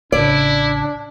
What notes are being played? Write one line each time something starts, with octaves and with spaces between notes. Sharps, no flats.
A1 C#3 D4 E4 D5